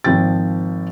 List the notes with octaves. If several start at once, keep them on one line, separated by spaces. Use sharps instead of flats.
G#1 F3 G5 A6